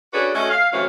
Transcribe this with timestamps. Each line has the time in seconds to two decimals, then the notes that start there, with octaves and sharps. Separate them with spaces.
0.13 C#4 D4 F#4 G#4 A4 B4
0.35 A3 C#4 F#4 D#5
0.50 F5
0.73 C3 E3 F#3 A3 C#4 F5